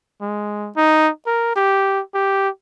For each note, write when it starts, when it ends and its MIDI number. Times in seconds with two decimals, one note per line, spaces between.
0.21 0.70 56
0.76 1.09 63
1.27 1.54 70
1.56 2.00 67
2.14 2.49 67